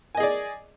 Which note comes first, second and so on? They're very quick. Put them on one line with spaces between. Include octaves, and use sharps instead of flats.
G#5 D#5 G#4 D5